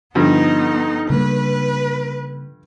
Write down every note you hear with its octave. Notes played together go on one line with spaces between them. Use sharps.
G2 D3 F3 B3 D#4
C#3 G3 A#3 B4